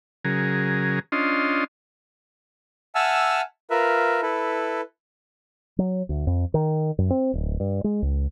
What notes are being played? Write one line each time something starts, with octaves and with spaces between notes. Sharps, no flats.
C#3 F#3 G#4 A#4
C#4 D4 F4 D#5 C6
E5 F#5 G#5 A5 E6 F6
F4 A#4 B4 E5
E4 A4 B4
F#3
D2
F2
D#3
F#2
C4
D1
G2
G#3
C#2